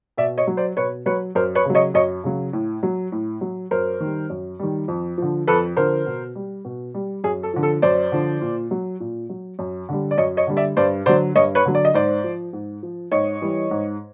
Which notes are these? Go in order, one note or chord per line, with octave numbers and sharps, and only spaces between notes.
B2 D5 E5
C#5 D#5
F#3
C5 D5
B2 B4 C#5
F#3 B4 C#5
F#2 A#4 C5
B4 C#5
C#3 F#3
C#5 D#5
F#2 C#5 D#5
C#3 F#3
A2
F#3
A2
F#3
F#2 A#4 C5
D#3 G3
F#2
D#3 G3
F2
D3 F3
F2 A4 B4
D3 F3 A#4 C5
B2
G3
B2
G3
F#2 G#4
A4
D3 F3
A4
F#2 C5 D5
D3 F3
A#2
F#3
A#2
F#3
F#2
D3 G3
D5
F#2 C#5 D#5
C#5 D#5
D3 G3
D5 E5
G2 C5 D5
D3 F#3 C5 D5
G2 C#5 D#5
B4 C#5
D3 F#3
D5
D#5
G#2 C5 D5
F3
G#2
F3
G#2 C#5 D#5
E3 G3
G#2